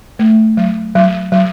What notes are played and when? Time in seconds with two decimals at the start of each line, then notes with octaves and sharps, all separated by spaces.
0.19 A3
0.57 F#3
0.95 F#3
1.32 F#3